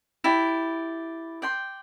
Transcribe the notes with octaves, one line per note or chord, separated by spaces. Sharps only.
E4 G4 D5
D5 G5 C6